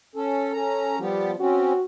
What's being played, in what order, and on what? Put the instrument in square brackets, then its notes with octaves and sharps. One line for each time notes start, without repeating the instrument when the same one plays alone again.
[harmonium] C#4 A4
[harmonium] C#4 A#5 [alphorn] A4
[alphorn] F3 [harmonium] G3 B3 G4
[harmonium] C4 C#4 [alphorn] F#4